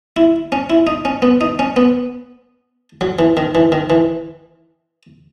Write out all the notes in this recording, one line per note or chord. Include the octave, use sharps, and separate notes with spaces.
E4
C#4
E4
D#4
C#4
B3
D#4
C#4
B3
F#3
E3
D#3
E3
D#3
E3